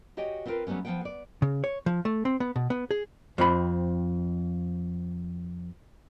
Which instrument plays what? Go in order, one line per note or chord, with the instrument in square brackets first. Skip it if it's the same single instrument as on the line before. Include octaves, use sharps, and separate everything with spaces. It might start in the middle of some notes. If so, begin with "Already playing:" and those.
[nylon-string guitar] F#4 G4 C#5 D#5 G5 G#5
B3 C4 F4 F#4 A#4 B4
F#3 G3 A3 B3 C#4
F3 G#3 B3 F#5 G5
B3 D5
[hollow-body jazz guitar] C#3
C#5
F3
A3
C4
B3
B2
B3
G#4
F2 C4 B5